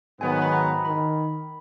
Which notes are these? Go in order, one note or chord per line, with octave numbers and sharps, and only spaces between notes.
G#2 D#3 F#3 B3 G#5
B5
A#5
D#3 B5